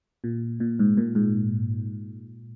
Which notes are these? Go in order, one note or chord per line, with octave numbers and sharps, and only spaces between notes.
A#2
A#2
G#2
A#2
G#2